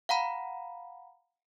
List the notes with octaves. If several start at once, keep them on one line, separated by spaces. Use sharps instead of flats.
F5 F#5 A#5 B5